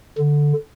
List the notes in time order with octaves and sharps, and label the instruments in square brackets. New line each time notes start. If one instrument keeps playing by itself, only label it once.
[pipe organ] D3